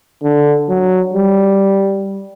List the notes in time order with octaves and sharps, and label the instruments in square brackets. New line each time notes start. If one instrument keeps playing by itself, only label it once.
[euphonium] D3
F#3
G3